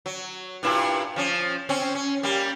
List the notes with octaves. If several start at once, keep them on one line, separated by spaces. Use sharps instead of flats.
F#3
G2 A#2 E4
F3 C#4
C4 C#4
C#4
G3 A#3